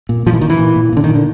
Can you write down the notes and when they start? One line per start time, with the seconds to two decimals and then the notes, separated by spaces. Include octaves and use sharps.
0.09 A#2
0.26 A#2 F3
0.34 E3
0.41 A#2 D#3
0.50 E3
0.59 A#2
0.76 A#2
0.93 A#2 D3
1.04 D#3
1.09 A#2
1.15 D3